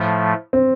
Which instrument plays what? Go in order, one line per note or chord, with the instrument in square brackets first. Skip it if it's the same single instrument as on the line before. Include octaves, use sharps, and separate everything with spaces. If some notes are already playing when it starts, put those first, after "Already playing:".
Already playing: [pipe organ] A2 F3 A3
[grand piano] C4